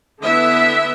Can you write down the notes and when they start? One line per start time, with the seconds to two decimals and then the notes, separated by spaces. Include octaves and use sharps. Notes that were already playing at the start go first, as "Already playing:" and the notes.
0.23 D3 B3 E4 E5